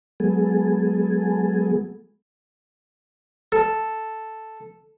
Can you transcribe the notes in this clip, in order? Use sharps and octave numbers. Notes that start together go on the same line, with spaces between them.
F#3 G#3 B3 G#4 A4
A4